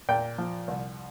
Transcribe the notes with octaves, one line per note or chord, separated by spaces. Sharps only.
A#2 G5
F3
C2